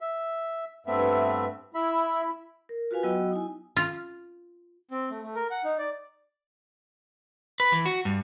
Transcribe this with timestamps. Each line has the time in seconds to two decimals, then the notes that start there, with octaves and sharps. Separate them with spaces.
0.01 E5
0.87 G2 A3 B3 C4 E5
1.75 E4 E5 B5
2.69 A#4
2.91 F4 F#4 B4 F5 G#5
3.03 F#3 B3 F#4 D#5 G5 E6
3.31 D#4 E4 G#5
3.77 F4
4.91 C4
5.10 A3
5.23 A3
5.36 A#4
5.51 F#5
5.64 D#4
5.78 D5
7.60 B4
7.72 E3
7.86 F#4
8.05 G2